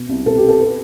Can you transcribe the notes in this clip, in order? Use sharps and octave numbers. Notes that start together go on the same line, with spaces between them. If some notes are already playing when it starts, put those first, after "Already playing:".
Already playing: B2
C2
B2 A4
G4
B2
A4
B4